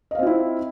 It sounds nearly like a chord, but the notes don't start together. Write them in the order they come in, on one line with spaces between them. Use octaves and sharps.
D#5 F5 C4 F4 E4